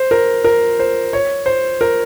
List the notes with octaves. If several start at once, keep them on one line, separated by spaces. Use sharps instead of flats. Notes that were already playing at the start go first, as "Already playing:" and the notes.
Already playing: C5
A#4
A#4
C5
C#5
C5
A#4